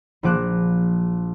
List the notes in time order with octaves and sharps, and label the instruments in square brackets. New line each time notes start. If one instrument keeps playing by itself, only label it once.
[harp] A#1 F3 D6 F#6 E7